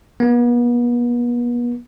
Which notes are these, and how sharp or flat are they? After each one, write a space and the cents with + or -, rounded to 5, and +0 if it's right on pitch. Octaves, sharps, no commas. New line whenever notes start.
B3 -40